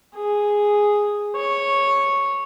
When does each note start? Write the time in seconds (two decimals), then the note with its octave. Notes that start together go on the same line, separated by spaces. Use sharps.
0.17 G#4
1.36 C#5